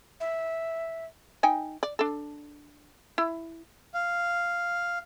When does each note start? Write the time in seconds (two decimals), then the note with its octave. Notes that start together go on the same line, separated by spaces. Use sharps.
0.20 E5
1.43 D#4 G5 G#5
1.83 D5
1.99 D4 A4
3.18 E4
3.93 F5